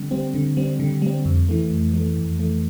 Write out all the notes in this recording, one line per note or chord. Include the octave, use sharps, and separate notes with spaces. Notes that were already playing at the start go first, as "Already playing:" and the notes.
Already playing: D3 G3 C4
G3 C4
D3
G3 C4
D3
G3 C4
F2
E3 A3
F2
E3 A3
F2
E3 A3